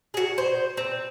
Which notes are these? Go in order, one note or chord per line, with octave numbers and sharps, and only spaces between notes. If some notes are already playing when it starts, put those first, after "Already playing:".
F#4 G#4
C5
C4